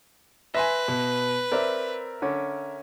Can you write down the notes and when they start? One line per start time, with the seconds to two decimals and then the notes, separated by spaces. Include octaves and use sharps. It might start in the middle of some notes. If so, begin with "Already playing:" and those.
0.55 B4 E5 G#5 C6 A#6
0.88 B2
1.52 C4 A#4 D5 E5
2.22 D3 C#4